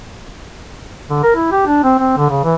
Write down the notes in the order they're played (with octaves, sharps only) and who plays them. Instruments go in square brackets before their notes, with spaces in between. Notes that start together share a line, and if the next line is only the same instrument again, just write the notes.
[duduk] D3
A#4
E4
G4
D4
C4
C4
D3
C#3
E3